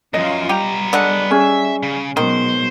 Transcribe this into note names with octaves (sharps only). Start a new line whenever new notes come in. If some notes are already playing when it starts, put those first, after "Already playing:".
F#2 F3 C#4 F4 D#5
G3 B3 G4 A#5
D3 G#3 F#5
C#4 G#4 E5
C#3
B2 D#3 F#3 G#3 C5